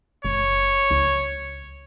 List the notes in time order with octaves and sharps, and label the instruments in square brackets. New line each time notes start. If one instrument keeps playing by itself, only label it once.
[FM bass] F#1 [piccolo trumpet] C#5
[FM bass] C#2